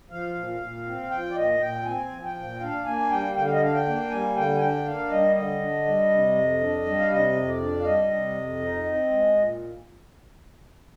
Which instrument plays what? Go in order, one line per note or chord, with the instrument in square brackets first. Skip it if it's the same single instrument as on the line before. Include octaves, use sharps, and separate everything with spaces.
[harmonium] F3 F5
A#2
A#2
C4
F3 G5
D5
A#2 D#5
A#2 G5
C4 G#5
F3
G5
A#2
D4 F5
A#3 G#5
G3 G5
D3 G5
F5
D#5
D4 F5
G5
A#3
G3 G#5
D3 G5
G#5
D4 G5
A#3 F5
G3 D#5
D3 D#5
D4
G3
C3
F2
D4
G3
F5
C3 D#5
F2
D5
D4
F5
G3 D#5
C3
F2
D#4
C4
G#3
A#2